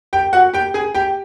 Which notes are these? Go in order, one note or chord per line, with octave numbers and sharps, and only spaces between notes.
G4 G5
F#4 F#5
G4 G5
G#4 G#5
G4 G5